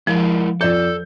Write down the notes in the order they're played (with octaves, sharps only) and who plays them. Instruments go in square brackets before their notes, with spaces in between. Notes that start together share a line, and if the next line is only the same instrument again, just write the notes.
[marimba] F3 [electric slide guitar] G#3 E4 A#4
[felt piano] F2 D5 G6 [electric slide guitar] A4